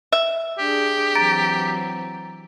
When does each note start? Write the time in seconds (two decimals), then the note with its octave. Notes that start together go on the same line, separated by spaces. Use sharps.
0.12 E5
0.58 D4 G4 G#4
1.15 E3 F#3 C4 A#5 A6 D7